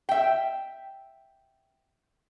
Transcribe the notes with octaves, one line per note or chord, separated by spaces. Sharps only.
E5 G5